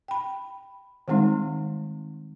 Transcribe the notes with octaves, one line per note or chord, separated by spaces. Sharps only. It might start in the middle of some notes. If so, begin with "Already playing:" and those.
G5 B5
D#3 G3 G#3 C4 D#4